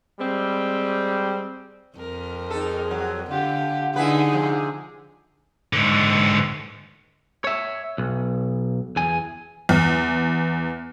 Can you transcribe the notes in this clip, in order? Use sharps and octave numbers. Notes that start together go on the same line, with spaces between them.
G3 G#3 C4
F2 A#4
D#4 G#4 A4
F#3
D3 F4 G4 F#5
D3 D#4 E4 G#4 B4
C3 F3
G#2 D3
C#5 E5
B1
E2 G#5
E2